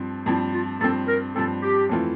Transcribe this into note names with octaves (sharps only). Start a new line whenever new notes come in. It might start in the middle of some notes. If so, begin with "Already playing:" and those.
Already playing: G2 F3 C4
G2 F3 C4 E4
F4
G2 F3 C4 A4
A#4
G2 F3 C4 A4
G4
F2 E3 A3 C4 F4